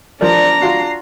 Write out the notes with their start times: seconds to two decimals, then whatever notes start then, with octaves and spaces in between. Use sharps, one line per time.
0.21 F3 D4 A#4 D5 A#5
0.62 F4 F#4 C7